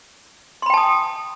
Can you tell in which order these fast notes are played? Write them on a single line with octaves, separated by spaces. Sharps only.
C6 B5 G5 A5 D#6